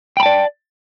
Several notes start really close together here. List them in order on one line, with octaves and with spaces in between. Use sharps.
G5 B5 A5 D5